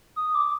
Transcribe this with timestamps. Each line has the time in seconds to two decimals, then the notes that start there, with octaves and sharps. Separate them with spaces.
0.16 D#6
0.35 D6